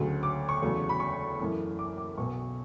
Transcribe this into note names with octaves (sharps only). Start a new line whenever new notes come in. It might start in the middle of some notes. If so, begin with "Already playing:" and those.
Already playing: D2 C#3 F#3 A3
D6
C#6
E2 C#3 F#3 A3
B5
C#6
F#2 E3 A3
D6
D6
B1 B2 F#3 C#6